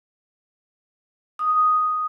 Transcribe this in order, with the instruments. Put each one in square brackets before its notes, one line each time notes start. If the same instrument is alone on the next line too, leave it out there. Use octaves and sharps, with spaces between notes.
[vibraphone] D#6